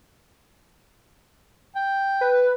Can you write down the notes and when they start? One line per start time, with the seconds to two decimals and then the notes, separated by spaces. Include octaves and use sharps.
1.75 G5
2.21 B4